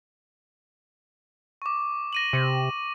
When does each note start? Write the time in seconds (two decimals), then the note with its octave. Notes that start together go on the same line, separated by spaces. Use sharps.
1.62 C#6 D6
2.13 A#6 D#7 F#7
2.33 C3